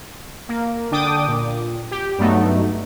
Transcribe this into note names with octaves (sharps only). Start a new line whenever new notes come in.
A#3
D3 D4 G5 D6 D#6
A#2
G4
G2 F#3 A3 B3 D#4